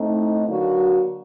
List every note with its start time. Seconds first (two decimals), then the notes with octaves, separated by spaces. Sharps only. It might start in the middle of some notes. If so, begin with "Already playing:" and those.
Already playing: A2 A3 C4 D#4
0.45 D3 F#3 A#3 F#4